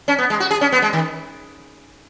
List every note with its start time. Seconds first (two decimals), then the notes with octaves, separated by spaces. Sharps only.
0.08 C#4
0.19 B3
0.30 G#3
0.40 F#4
0.51 G#4
0.61 C#4
0.72 B3
0.82 G#3
0.93 D#3